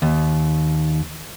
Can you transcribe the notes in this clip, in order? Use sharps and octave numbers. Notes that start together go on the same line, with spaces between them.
D#2